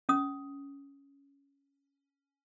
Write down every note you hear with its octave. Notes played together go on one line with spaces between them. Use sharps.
C#4 D#6